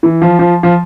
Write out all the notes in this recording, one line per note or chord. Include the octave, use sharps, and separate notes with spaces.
E3
F3
F3
F3